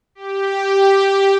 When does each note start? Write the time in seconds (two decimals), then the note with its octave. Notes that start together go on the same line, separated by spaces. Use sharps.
0.15 G4